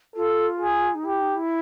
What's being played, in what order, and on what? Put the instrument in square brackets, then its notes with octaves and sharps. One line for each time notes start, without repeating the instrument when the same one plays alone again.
[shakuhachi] F4 [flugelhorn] A4
[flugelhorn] G#4
[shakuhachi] D#4
[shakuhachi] E4 [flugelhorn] G4
[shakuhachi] D#4
E4